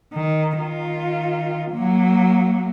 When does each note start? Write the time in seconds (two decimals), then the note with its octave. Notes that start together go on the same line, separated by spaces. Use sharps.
0.14 D#3
0.56 D#3 F4
1.72 F#3 A#3